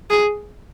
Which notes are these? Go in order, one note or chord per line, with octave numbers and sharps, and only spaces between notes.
G#4